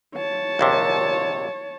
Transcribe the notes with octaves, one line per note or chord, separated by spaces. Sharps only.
C#5 A5
A#1 D#2 C3